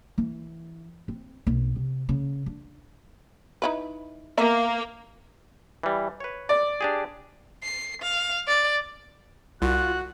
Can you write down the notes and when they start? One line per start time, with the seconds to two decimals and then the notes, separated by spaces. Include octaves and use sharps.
0.18 E3
1.08 C4
1.47 B1
1.76 C3
2.09 C#3
2.46 D4
3.62 D#4 E4 B4
4.38 A#3 B3 E5 A#5
5.83 E3 G3
6.20 B4 C#5
6.49 D5
6.81 D4 G4 G#4
7.63 C7
8.02 F5
8.47 D5
9.62 C2 F4 F#4 F#6